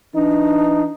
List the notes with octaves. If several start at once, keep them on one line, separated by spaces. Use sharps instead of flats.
E3 D4 D#4